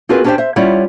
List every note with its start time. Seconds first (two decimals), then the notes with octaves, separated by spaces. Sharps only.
0.09 C4 F4 F#4 G#4 A#4 B4
0.24 C#4 D4 G4 A#4 C5 G5
0.38 C5 E5
0.56 G3 C#4 E4 F4 C#5 F#5